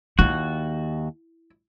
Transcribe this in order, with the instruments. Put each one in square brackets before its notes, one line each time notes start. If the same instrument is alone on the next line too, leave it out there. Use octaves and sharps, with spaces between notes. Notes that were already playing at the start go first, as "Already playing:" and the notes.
[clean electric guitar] D#2 F#4 [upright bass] E4